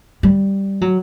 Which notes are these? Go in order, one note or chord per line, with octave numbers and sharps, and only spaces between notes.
G3
F#3